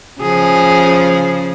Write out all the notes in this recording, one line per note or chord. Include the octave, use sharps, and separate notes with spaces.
C#3 F3 G#4